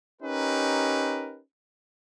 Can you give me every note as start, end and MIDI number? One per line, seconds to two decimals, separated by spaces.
0.21 1.39 61
0.21 1.39 63
0.21 1.39 67
0.21 1.39 70
0.21 1.39 71